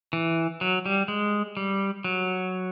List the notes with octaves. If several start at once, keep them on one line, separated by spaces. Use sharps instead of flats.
E3
F#3
G3
G#3
G3
F#3